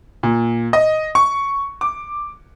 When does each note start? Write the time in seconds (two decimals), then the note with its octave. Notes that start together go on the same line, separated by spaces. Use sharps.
0.23 A#2
0.73 D#5
1.15 C#6
1.81 D6